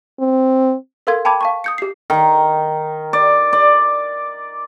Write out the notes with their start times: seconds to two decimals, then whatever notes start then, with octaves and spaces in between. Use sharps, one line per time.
0.20 C4
1.07 A4 A#4 F5 C6 G#6
1.25 G5 A5 B5 D6 G#6
1.41 F5 A5 C#6
1.64 D#6 G6 C#7
1.78 G4 C7
2.10 D#3
3.13 D5
3.53 D5